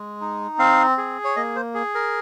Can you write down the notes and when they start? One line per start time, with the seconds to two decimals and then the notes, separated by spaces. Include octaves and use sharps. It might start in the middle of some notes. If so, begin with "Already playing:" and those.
Already playing: G#3
0.21 D#4
0.59 C4 F5
0.98 G#4
1.24 C#5
1.36 A#3 D#5
1.56 C5
1.74 G#4
1.95 A#4